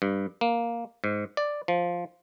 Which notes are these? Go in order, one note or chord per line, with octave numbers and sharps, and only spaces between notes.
G2
A#3
G#2
D5
F3